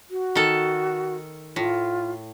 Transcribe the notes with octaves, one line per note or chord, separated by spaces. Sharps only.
F#4
D#3 A4
A2 F4